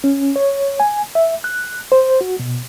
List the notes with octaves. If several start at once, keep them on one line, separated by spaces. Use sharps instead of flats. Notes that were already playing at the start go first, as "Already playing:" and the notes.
C#4
C#5
G#5
E5
F#6
C5
F#4
B2